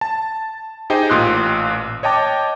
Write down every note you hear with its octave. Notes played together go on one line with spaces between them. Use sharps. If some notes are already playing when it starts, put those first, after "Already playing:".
A5
D#4 G4 G#4 C5 D#5 G5
A1 A#2 C6 D#6 F#6
C#5 D#5 G5 A5 D6